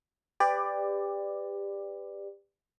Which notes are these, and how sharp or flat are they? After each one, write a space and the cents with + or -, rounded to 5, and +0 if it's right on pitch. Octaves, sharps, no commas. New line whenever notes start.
G4 +25 B4 +30 D5 +10